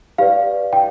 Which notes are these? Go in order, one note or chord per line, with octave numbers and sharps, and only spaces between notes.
G4 B4 D5 F5
G5